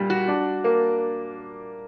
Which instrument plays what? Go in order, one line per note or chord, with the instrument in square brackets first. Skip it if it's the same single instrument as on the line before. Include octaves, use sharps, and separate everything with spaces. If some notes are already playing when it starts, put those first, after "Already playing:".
Already playing: [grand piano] A#2 G3
[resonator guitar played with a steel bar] F#4
[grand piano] D4
A#3